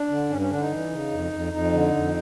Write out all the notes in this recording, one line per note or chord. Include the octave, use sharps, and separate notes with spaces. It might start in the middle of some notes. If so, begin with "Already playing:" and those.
Already playing: D4
D3
G2 C#4
C#4
D3 D4
D#4
E3
C#3
F2
F2
F2 D#4
D3
F2